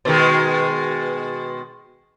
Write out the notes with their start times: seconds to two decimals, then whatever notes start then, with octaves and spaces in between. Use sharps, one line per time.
0.05 B2 D#3 G#3